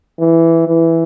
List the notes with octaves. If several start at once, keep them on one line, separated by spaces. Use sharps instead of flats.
E3
E3